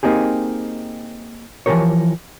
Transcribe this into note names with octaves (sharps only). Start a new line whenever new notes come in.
A#3 C4 D#4 G4 G#4
E3 F3 G3 G4 A#4 C#5